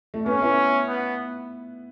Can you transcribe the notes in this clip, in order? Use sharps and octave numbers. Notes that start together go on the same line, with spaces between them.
A3
B3 C#4
B3 E4
B3